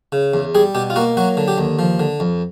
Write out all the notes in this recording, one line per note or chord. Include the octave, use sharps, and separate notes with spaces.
C#3
E2
G3 G#4
B2 G4
F4
A#3 F#4
F#3 F#4
D3
G4
D#2
F3
D3
F2